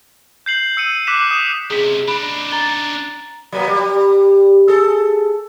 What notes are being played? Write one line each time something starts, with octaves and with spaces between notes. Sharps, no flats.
G6 C7 F#7
E6 C#7 D#7
D6 F#6 B6 E7
D#6 E7
C#2 C3 G#4 B6
D4 D#4 B5
A#5 A6 G7
F#3 A#3 B3
G3
G#4 A4